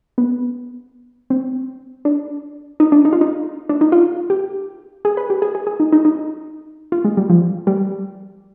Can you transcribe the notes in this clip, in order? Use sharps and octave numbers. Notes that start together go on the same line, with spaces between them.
B3
C4
D4
D#4
D4
D#4
F4
D#4
D4
D#4
F4
G4
G#4
B4
G4
G#4
G#4
G#4
D#4
D#4
D#4
F4
G#3
G3
F3
G3